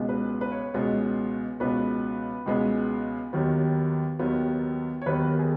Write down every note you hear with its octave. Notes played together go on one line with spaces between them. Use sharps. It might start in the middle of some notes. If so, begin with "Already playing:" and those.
Already playing: C#2 B2 G#3 B3
B4
B4
C#5
C#2 B2 G#3 B3
C#2 B2 G#3 B3 B4
C#2 B2 G#3 B3
D#2 D#3 F#3 B3
D#2 D#3 F#3 B3
C#5
D#2 D#3 F#3 B3 B4
A#4
G#4